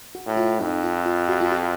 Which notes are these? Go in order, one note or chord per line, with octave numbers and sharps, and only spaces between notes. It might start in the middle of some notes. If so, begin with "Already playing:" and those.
F#4
A2
F4
F2 D#4
F4
F4
F#4
F4
F#4